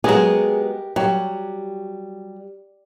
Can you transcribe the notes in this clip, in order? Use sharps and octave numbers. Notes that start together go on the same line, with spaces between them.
F#3 G#3 B3 G4 G#4 A#4
F#3 G3 G4